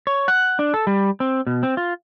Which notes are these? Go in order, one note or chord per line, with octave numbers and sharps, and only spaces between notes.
C#5
F#5
D4
A4
G3
C4
B2
C4
F4